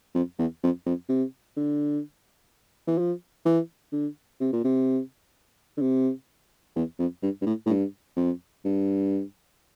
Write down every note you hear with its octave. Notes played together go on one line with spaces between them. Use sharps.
F2
E2
F2
F2
C3
D3
E3
F3
E3
D3
C3
A#2
C3
D3
C3
E2
F2
G2
G2
A2
A2
G2
F2
G2